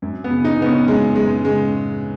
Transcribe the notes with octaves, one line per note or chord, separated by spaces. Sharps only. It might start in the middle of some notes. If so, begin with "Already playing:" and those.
F#2
B3
C#3
D#4
C#3 B3
C#4
F#2 G#3
F#2 G#3
C#3 G#3